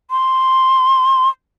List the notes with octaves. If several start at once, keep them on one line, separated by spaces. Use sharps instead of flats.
C6